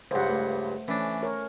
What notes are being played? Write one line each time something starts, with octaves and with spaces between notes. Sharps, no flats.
C#2 G2 C5 F#5
A3
E3 A3 C#4 D4
A#4 C#5